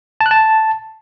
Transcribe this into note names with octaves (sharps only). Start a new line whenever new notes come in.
A5
F#6
A5